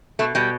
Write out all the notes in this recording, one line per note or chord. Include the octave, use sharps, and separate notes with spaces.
B2 A3
B2 G3